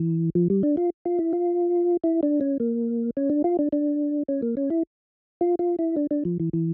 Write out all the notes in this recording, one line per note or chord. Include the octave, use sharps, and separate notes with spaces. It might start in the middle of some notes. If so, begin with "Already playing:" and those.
Already playing: E3
F3
G3
D4
F4
F4
E4
F4
E4
D4
C#4
A#3
C#4
D4
F4
D4
D4
C#4
A#3
C#4
E4
F4
F4
E4
D4
D4
F3
E3
E3